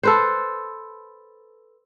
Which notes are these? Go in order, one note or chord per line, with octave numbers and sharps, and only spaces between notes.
A4 B4 C5